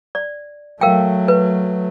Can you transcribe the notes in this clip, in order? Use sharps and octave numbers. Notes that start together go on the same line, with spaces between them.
D5
F#3 A3 A#4 F5 G5
B4